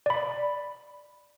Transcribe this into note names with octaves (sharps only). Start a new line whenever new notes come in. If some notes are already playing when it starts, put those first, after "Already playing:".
D5 B5